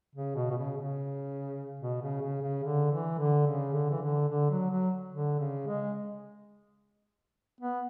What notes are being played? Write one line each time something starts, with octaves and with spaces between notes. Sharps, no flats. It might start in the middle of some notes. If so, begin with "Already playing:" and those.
C#3
B2
B2
C#3
C#3
B2
C#3
C#3
C#3
D3
E3
D3
C#3
D3
E3
D3
D3
F#3
F#3
D3
C#3
G#3
B3